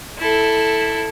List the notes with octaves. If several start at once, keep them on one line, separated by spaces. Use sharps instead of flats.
E4 A4